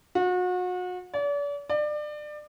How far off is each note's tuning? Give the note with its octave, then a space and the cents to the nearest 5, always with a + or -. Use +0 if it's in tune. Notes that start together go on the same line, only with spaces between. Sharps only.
F#4 -35
D5 -40
D5 +30